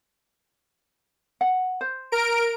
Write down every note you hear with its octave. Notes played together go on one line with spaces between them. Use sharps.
F#5
C5
A#4 D7